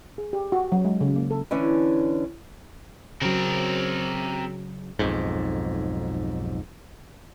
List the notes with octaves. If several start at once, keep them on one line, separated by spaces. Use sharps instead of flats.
G#4
G4
F#4
F#3
G#3
C#3
A#3
A4
D3 E3 C#4
C#3 F#3 C4 A#4
B1 F2 G#2